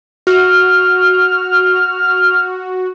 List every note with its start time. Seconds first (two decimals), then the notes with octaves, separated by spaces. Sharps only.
0.27 F#4 F6